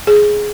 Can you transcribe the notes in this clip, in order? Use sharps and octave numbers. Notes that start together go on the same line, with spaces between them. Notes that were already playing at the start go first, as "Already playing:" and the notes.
G#4